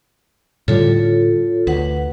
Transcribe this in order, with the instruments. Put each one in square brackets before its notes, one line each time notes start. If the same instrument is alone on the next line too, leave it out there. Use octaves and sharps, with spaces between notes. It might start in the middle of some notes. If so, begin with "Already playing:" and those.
[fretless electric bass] A2 D3 G3 [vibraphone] F4 A4 C#5
[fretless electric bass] D2 [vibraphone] B4 F#5